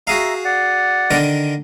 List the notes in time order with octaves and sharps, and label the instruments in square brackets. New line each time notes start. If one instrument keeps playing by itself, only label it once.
[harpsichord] F#4 G#4 F5 [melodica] E5 A#5
[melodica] D5 F#5
[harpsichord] D3 D#3 A#4